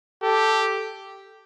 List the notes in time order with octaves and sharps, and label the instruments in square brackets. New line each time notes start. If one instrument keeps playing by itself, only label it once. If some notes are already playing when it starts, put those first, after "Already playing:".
[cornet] G4 [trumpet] A4